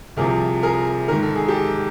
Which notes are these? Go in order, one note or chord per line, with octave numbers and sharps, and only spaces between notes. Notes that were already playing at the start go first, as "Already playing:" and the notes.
C2 C3 F3 G#4 A#4
G#4 A#4
G#2 D#3 A#4
A4
G#4
G4 A4